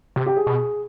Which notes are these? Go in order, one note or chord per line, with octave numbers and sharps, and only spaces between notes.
C3 G4
G4
G#4
B2